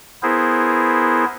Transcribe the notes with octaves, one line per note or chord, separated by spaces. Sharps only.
B3 E4 G#4 A#4 C5